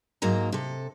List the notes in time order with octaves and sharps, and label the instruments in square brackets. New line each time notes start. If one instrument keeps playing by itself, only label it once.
[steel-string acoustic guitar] G#2 F#3 A#3 A#5
C3 A4